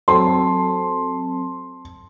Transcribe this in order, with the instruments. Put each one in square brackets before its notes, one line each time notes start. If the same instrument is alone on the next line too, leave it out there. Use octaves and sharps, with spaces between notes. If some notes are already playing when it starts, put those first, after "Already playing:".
[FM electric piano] F#3 C4 A4 [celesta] A5 [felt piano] C6